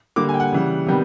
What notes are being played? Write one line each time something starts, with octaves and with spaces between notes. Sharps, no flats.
D3 G3 A#3 D6
G#5
G5
F#5
C#3 E3 G3
C3 D#3 G3 B3